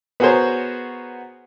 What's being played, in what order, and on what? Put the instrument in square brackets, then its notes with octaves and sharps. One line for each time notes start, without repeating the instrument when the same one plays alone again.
[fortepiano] B3 F#4 G#4 A#4 C5 C#5